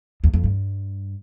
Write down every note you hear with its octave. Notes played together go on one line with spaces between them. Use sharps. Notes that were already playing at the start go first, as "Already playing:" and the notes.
E2
F2
G2